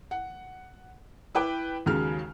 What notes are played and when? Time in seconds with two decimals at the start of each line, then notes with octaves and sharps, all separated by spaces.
0.11 F#5
1.35 E4 B4 G5 D6
1.86 D#2 C#3 F#3 G#3 F6